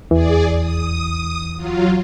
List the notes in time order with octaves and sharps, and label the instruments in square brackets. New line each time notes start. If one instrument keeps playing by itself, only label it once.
[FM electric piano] E2 [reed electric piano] E3 [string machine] G#4 D5
[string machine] D#6
F#3 F4